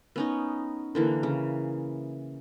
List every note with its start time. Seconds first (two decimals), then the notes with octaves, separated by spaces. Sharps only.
0.16 B3 C#4 D#4
0.95 D3 E3 A#3
1.23 C#3